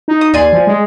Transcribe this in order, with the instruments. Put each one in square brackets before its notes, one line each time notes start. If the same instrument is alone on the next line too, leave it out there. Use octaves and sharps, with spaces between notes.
[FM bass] D#4
[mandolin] D#6
[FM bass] D#2 [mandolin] D5 G#5 C6
[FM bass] F3
G#3